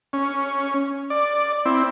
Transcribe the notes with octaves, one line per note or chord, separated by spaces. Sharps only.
C#4
D5
C4 E4